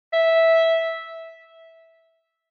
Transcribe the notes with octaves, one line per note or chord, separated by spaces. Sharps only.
E5